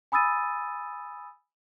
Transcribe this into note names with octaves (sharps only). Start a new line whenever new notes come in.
G#5 B5 D#6 E6 A6 D#7